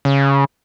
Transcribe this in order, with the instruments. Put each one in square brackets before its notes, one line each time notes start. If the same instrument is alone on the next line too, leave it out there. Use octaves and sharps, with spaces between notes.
[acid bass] C#3